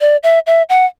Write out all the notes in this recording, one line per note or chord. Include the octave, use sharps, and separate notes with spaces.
D5
E5
E5
F#5